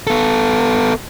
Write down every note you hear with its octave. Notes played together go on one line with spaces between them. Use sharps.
B3 A4